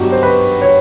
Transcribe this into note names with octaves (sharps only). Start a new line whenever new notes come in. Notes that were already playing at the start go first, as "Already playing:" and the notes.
Already playing: G2 F#3 B3 D#4 F#4 G4
C5
B4
C#5